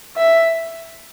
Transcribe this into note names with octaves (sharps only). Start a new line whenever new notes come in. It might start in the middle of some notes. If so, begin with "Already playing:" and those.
E5